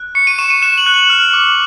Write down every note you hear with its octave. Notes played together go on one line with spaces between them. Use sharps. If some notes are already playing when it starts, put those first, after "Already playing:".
Already playing: F#6
C#6 C#7
D#7
C#6 E7
D#7
F#6 E7
F#7
F#6
F#7
F6
D6